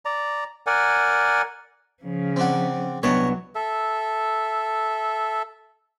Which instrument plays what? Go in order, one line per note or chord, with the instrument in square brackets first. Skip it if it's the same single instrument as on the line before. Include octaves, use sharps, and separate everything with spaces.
[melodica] D5 A#5
A#4 D5 F#5 G#5
[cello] C#3 F3
[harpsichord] C4 D4 F#5
[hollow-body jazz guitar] C2 B3 D4 [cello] F#3 [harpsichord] C#5 D#5
[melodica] A4 E5